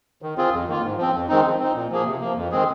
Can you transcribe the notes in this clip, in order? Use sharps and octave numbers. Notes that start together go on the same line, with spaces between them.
D#3
C4 F4 G#4
F2
D#3 A#3 F4
G#2
F3 C4
F2
D#3 G#3 C4 D#4
F3
C4 D#4
A#2
F3 A#3 G#4
C3
F3 A#3
F2
D#3 G#3 C4 G#4